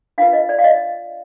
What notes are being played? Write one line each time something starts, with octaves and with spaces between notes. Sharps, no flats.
D4 F4 B4 F5
D#5
D5
F5
D#5